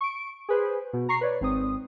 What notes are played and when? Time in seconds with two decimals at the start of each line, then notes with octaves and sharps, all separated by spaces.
0.01 C#6 D7
0.49 G#4 B4 C5
0.93 B2
1.09 A#5 C#6 C7
1.21 B4 C#5 D5
1.41 G#1 C4 D#6